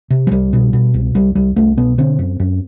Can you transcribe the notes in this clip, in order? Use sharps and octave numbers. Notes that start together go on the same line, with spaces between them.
C3
F#3
C2 G3
B2
B2
C2
C2 G3
C2 G3
C2 A3
B2 B3
D3 C4
F#2
F#2